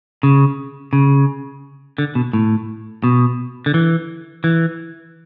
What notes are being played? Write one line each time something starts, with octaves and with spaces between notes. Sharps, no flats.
C#3
C#3
D3
B2
A2
B2
D3
E3
E3